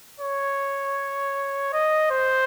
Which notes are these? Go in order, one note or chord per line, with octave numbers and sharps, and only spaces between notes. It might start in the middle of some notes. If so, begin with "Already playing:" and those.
C#5
D#5
C5